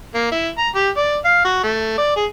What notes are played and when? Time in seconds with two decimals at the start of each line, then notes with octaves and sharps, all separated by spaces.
0.15 A#3
0.32 E4
0.58 A#5
0.75 G4
0.97 D5
1.25 F5
1.45 F#4
1.64 A3
1.98 D5
2.16 G#4